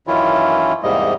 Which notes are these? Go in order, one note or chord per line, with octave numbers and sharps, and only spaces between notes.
F#2 D#3 E3 C#4 E4 F4
E2 G#2 C3 G3 A#3 D#5